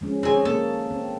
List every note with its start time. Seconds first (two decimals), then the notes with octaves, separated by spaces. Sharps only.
0.01 F3 G#3 C#4
0.23 C4 D#4 G#4 C#5 G#5
0.45 A#3 A4
0.91 C4